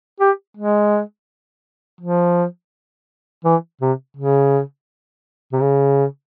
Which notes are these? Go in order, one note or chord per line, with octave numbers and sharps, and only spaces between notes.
G4
G#3
F3
E3
C3
C#3
C3
C#3